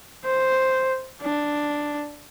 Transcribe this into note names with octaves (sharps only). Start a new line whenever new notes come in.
C5
D4